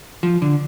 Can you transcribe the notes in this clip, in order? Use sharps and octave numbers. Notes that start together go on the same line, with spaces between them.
F3
D3